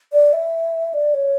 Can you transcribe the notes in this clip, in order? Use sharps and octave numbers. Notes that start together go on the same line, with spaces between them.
D5
E5
D5
C#5